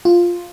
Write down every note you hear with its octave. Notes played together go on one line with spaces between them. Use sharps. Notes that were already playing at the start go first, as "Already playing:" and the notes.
F4